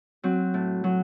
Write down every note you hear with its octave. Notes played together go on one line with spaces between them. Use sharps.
F#3 C4
A2
F#3